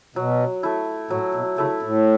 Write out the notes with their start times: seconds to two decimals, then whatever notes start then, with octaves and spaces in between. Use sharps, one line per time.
0.16 B2 F#3
0.63 A3 E4
1.10 A2 F#3
1.35 B2
1.58 C#3 A3 E4
1.83 A2